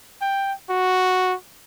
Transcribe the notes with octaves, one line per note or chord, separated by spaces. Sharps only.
G5
F#4